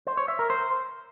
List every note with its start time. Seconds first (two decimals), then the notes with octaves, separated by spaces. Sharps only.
0.07 C5
0.17 C#5
0.28 E5
0.39 A#4
0.50 C5